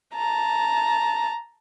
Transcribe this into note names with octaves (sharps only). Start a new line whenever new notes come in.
A5 A#5